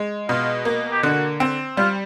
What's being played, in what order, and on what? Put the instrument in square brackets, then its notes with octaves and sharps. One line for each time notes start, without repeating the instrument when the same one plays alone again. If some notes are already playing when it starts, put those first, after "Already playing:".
Already playing: [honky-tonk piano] G#3
[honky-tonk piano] B2 [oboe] F4
[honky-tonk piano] A#3
[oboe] G4
[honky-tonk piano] D3 [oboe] F#4
[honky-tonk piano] C4
[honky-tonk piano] G3 [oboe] F4